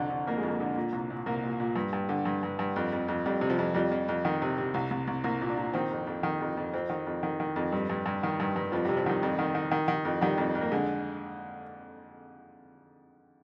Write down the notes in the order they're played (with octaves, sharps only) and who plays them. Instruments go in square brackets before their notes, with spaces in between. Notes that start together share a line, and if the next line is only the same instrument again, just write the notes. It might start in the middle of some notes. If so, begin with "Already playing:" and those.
Already playing: [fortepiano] C2 F2 D3
D3
F2 A#3
G#3
F2
A#3
D3
A#2
C2
A#2
C2 A#3
A#2
A#2
G2
G2
D3
G2
G2
G2
F2
F2
F2
F2 G3
C3
F3
F2
F2 G3
F2
F2
D#3
C3
C3
C2
C2
C2
C2 A#3
A#2
D4
A#2
D#3 C4
F2
F2
D#3
F2
F2
F2 C4
D#3
F2
D#3
D#3
F2
G2 G3
G2
G2
D#3
G2
G2
F2 F3
C3 G3
F3
D#3 G3
F2
D#3
D#3
D#3
D#3
F2
D#3 G3
F2
F2
A#3
D3 G#3